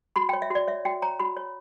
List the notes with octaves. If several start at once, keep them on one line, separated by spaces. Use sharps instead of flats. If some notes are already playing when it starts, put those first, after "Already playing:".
F#4 B5
G5
C#5
E5
F#4 D5
C#5 E5
F#4 G5
C#5 A#5
F#4 B5
C#5